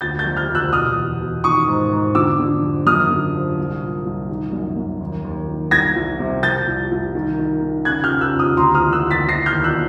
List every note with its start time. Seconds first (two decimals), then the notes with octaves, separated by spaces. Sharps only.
0.01 D2 G6 A6
0.19 G6 A6
0.25 F3
0.36 F6 G6
0.49 D2
0.55 E6 F#6
0.73 B2 D#6 F6
0.96 E2
1.20 B2
1.44 D#3 C#6 D#6
1.68 G#2
1.92 G#2
2.15 D3 D6 E6
2.39 D3
2.63 F2
2.87 F#2 D#6 F6
3.10 D3
3.35 F3
3.58 C2
3.81 A#2
4.06 C2
4.30 D#3
4.53 F#2
4.77 F#2
5.00 D#2
5.25 D#2
5.48 D#3
5.71 C2 G#6 A#6
5.96 C2
6.19 C3
6.43 F3 G6 A6
6.67 C2
6.91 C2
7.15 D#3
7.38 D#3
7.62 D#3
7.85 C#3 F#6 G#6
8.04 F6 G6
8.10 C#3
8.21 E6 F#6
8.33 C#3
8.39 D#6 F6
8.57 D2 A#5 C6
8.75 D#6 F6
8.81 E3
8.92 E6 F#6
9.05 D2
9.11 A6 B6
9.28 E3 A#6 C7
9.46 F6 G6
9.52 D#2
9.64 E6 F#6